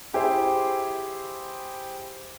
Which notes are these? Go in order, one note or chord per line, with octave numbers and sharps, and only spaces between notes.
E4 G4 G#4 C5 E5